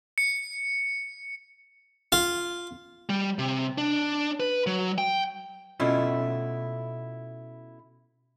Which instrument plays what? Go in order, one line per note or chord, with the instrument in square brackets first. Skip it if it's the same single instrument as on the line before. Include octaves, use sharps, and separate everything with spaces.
[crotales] C#7
[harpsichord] F4
[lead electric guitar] G3
C3
D4
B4
F#3
G5
[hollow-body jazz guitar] B2 A3 C#4 E4 F4